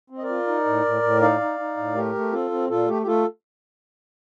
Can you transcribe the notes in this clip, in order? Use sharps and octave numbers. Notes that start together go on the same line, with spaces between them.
C4
D#5
A#4 D5
F4
D#4
A2
A2
A2
D#4 D5 F5
D#4
D#4
A2
A3 G4 A#4
A3
C4 F4 A4
C4
A#2 F4 A4
A3 G4
G4
A3 F4 A4